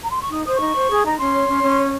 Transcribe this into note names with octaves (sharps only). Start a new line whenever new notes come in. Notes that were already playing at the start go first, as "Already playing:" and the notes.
A#5
C6
C#6
D#4 D#6
C5 D#6
C#6
D#4
C5
G#4 G#5
D#4 A#5
C#4 C6
C#5
C#4
C#4
C#5